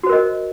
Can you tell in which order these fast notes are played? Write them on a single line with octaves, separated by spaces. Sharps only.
F#4 C5 A#4 D#5